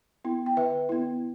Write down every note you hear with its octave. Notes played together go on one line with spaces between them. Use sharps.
B3 E4
G5
D3 B4 E5
B3 E4